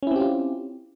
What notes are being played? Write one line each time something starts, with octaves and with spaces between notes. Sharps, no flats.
C4 C#4 E4 F4 G4